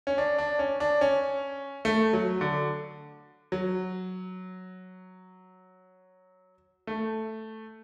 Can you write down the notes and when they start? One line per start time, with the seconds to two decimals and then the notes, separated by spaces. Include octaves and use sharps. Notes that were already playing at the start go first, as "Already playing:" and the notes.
0.07 C#4
0.18 D4
0.38 D4
0.59 C#4
0.80 D4
1.01 C#4
1.85 A3
2.13 F#3
2.41 D3
3.52 F#3
6.87 A3